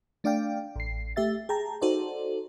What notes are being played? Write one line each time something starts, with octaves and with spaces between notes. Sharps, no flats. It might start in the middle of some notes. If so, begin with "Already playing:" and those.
A3 D4 D5 F5 G5
A1 C7
A3 G4 E5 A6
G#4 G5 A5 A#5
D#4 F#4 A4 C5 D5